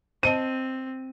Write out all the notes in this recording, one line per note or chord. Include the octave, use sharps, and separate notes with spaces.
C4 C5 D#5 A5 D#7